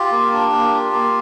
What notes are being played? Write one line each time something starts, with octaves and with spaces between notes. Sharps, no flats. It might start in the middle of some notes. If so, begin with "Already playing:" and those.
Already playing: F4 G4
A#3
D4
A#3
F4
A#3